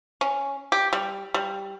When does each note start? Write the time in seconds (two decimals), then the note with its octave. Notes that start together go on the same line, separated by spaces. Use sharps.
0.21 C#4
0.72 G4
0.93 G3
1.34 G3